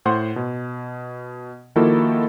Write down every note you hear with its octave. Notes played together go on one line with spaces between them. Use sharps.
A2 C5 F#5 C6
B2
D#3 F3 A#3 E4 F#4 A4